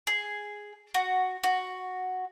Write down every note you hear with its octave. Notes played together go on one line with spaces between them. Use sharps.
G#4
F#4
F#4